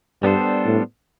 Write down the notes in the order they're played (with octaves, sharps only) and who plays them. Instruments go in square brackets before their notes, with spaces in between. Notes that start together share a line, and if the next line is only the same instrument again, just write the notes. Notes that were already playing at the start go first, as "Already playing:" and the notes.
[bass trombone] G2 [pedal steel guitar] G3 B3 D4 A4 C5
[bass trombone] A2